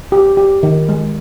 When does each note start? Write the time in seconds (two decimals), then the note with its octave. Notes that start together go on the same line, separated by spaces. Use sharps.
0.12 G4
0.37 G4
0.63 D#3
0.89 G#3